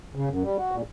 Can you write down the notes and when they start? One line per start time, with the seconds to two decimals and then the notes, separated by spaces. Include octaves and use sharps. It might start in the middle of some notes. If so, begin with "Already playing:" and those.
0.15 C#3
0.29 F#2
0.44 G3
0.57 F#4
0.71 A#2